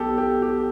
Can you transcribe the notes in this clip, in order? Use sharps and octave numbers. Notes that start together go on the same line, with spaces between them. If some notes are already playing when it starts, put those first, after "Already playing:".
Already playing: B1 B2 B3 G4 A4
G4
G4